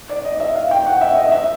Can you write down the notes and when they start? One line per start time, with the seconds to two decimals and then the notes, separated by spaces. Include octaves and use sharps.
0.09 D5
0.25 D#5
0.40 E5
0.55 F5
0.71 G5
0.86 F#5
1.01 E5
1.17 D#5
1.32 E5